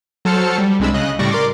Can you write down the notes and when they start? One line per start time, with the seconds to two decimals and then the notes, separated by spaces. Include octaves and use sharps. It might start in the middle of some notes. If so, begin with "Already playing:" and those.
0.25 F#3 A4 C5 A5 F6 C#7
0.58 G3
0.80 C2 C3 G#3 D4 B5 E6
0.94 C#3 D#5 F#6
1.19 A2 C#3 G3 D5 C#6 A#6
1.31 A#4 D5 C6 D6